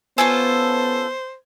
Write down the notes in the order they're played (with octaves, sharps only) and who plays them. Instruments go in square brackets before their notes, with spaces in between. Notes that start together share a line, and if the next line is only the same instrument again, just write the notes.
[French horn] B3 [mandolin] C#4 F4 A4 [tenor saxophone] C5 [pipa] G#5